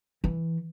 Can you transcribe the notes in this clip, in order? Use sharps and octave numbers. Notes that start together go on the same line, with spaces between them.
E3